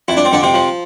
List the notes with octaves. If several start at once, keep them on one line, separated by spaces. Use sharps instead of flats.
F2 E4
D4
C4
F2 D3 D4
C3 C4
F3